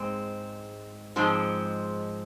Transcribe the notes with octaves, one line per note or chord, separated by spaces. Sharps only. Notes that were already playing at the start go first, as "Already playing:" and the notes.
Already playing: G#2 G#3 C4
G#2 F3 G#3 C4